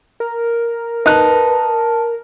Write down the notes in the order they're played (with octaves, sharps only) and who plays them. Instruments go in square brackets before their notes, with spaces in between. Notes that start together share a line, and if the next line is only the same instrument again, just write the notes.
[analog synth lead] A#4
[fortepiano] D#4 F#6 [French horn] B4 [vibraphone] A5